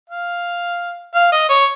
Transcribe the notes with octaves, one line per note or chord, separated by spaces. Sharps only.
F5
F5
D#5
C#5